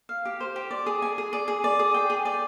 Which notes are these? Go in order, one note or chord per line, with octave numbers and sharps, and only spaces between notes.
F5
G4
C5
G4
D5
G#4
G#5
G#4
D5
G#4
D5
G#4
G5
G#4
D5